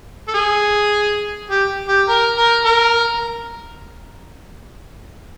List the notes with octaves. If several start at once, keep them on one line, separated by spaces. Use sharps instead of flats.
A4
G#4
G4
G4
A#4
A#4
A#4